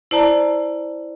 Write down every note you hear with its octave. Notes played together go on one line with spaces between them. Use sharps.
E4 C5 D5 A5 A#5